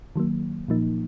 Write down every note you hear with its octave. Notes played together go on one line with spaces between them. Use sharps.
D#3 F#3 A#3
A#2 F3 A#3 D#4